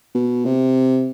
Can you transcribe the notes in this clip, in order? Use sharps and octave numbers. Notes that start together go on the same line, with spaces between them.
B2
C3